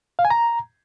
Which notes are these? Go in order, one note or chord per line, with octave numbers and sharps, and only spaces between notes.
F5
G#5
A#5